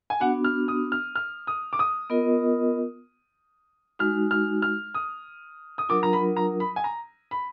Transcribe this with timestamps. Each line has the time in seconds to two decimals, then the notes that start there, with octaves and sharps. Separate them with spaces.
0.10 G#5
0.20 B3 D4 F#4 F#5
0.44 F6
0.68 D#6
0.92 F6
1.15 F6
1.47 D#6
1.73 D6
1.79 D#6
2.10 B3 F4 A#4 D#5
3.99 G#3 D#4 F#4 F6
4.31 F6
4.62 F6
4.94 D#6
5.78 D#6
5.89 F#3 D4 F4 A#4 D6
6.03 A#5
6.13 B5
6.36 A#5
6.60 B5
6.76 G#5
6.84 A#5
7.31 B5